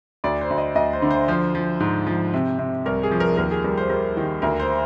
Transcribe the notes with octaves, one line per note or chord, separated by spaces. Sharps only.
D2 D5
C5
D2
D#5
D2 D#5
C5
D3
C5
F3 C5
F3
G#2
F3
C3
C3
C2 A#4
G#4
F3
A#4
D#2 A#4
G#4
G3 A#4
C5
G3 A#4
D#3
D2 A#4
C5